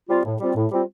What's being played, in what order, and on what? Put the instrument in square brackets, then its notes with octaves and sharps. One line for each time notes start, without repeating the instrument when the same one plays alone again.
[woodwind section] G3 C4 F4
A2
G3 C4 F4
A2
G3 C4 F4